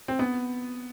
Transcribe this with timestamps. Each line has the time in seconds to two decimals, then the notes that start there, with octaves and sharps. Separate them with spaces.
0.08 C4
0.19 B3